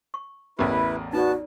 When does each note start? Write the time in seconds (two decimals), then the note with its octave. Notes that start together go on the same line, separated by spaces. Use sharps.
0.14 C#6
0.59 A1 E2 E4 G4 A#4 B4 D#5
1.13 B3 D#4 F#4 D5 A5